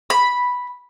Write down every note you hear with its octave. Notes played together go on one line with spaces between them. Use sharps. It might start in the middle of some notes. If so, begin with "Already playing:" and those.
B5